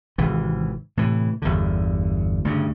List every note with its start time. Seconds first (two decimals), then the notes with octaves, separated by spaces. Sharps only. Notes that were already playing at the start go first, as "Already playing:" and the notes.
0.18 G#1 C3 E3
0.97 A2 C3 E3
1.42 G1 E2 G2 D3
2.45 D2 G2 C#3